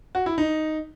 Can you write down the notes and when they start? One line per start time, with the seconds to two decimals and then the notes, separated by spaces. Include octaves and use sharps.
0.15 F#4
0.26 E4
0.38 D#4